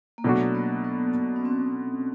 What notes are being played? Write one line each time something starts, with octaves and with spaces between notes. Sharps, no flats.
A#3
B2 F#3 A3 B3 D4 F#4
B3
B3
B3
C#4
C4